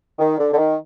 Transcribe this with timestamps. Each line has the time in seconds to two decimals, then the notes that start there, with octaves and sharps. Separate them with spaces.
0.19 D#3
0.38 D3
0.52 D3
0.57 D#3